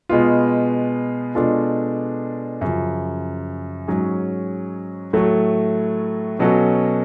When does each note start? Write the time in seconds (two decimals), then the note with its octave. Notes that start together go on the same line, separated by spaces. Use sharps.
0.09 B2 G#3 B3 F4
1.35 B2 G#3 D4 F4 A4
2.61 F#2 C#3 F3
3.88 G#2 F#3 C#4 G#4
5.13 A2 F#3 A3
6.39 B2 F#3 C#4 F#4 A4